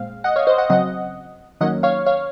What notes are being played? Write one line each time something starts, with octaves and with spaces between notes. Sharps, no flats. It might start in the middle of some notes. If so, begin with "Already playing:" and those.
Already playing: A#2 G#3 C4 F5
D#5 F#5
C#5 F5
C5 D#5
D#5 F#5
C#3 F#3 C4 D#5 F#5
D#3 F#3 A#3 C#4 D#5 F#5
C#5 F5
C#5 F5